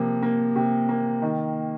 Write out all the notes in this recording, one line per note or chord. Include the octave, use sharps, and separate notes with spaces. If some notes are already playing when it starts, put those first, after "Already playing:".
Already playing: C3 F3 A#3
A#3
C3
A#3
D#3